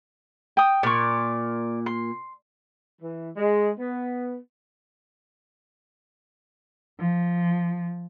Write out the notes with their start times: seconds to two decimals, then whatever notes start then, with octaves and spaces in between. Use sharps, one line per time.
0.57 G5 D#6
0.83 A#2 D5 C#6
1.86 C6
3.02 E3
3.37 G#3
3.78 B3
6.99 F3